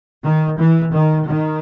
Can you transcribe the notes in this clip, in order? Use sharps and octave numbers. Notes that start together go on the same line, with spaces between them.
D#3
E3
D#3
D#3